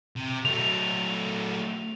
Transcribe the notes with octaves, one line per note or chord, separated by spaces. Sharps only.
C3
F#3 A3 F7